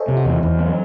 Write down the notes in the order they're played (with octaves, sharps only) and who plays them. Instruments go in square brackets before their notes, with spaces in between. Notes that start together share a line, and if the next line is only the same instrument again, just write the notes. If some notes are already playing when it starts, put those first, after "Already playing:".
Already playing: [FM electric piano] A4 C5 C#5 D#5 E5 G#5
[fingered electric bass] C3
[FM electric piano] F#4
[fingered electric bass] E2
E2
F#3